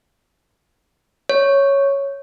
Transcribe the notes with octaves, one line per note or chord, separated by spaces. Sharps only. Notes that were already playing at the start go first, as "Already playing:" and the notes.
C#5